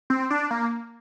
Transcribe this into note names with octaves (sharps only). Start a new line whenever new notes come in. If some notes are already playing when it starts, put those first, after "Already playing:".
C4
D4
A#3